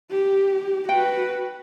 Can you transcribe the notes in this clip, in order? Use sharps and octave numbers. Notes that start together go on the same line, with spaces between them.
G4
F#4 B4 G5